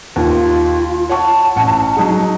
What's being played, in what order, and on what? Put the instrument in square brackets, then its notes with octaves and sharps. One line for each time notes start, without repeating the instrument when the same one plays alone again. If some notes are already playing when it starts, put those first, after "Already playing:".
[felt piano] D#2 [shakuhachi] F4
[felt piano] C#5 F#5 C#6 [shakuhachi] A5
[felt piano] A1 F#5 C#7
F#3 D#4 G#4